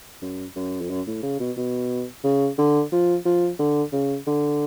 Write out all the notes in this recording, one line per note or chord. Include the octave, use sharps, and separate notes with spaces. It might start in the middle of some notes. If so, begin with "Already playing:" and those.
F#2
F#2
F2
F#2
A2
C#3
B2
B2
C#3
D3
F3
F3
D3
C#3
D3